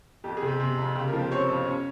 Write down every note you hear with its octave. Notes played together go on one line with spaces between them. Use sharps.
F2 G4
G#4
C3
G4
C3
F2
C#3 G4
A#4
F3
G4
C4 C#5
F2
C#4